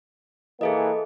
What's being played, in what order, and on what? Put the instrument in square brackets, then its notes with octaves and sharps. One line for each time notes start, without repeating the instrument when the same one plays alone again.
[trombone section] E3 A#3 [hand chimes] G#4 A4 D#5